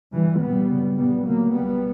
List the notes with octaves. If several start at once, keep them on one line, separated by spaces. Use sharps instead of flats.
G1 G2 E3 G3
A#1 A#2 G3 B3
G1 F#2 C#3
A#1 A#2 G3 B3
D2 C#3 F#3 A#3
C#2 B2 G3 B3